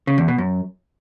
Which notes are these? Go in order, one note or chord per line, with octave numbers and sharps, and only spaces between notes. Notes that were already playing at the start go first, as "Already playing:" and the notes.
C#3
E2
B2
F#2